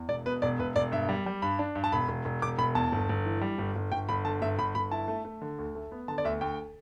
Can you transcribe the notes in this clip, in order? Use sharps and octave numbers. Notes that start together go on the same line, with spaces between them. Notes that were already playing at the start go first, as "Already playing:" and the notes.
Already playing: E2
E1 D5
B2 B4
E1 D5
E1 B4
E1 D5
G2 E5
G3
G3
G2 B5
D4
G2
A5
E1 B5
E1
E1
E1 D6
E1 B5
E2 A5
G1
G1
E3
G3
G1
G1
G1 G5
G1 B5
D3 A5
G1 E5
G1 B5
G1 B5
E4 A5
A3
A3
D3
D2
A3
B3
D3 A5
D5
D2 E5
D2 G5